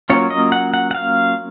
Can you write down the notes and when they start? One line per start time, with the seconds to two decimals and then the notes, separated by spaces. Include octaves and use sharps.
0.10 F#3 A#3 C#4 F4 C#5
0.30 D#5
0.52 F#5
0.74 F#5
0.91 F#5
0.95 F5